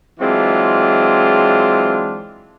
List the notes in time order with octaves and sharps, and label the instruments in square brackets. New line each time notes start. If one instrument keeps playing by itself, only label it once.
[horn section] E3 F#3 G#3 C4 D4 F4